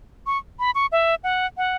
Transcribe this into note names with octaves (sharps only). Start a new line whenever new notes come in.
C#6
B5
C#6
E5
F#5
F#5